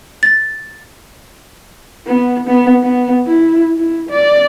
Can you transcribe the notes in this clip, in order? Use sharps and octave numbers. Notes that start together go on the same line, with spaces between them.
A6
B3
B3
B3
E4
E4
D5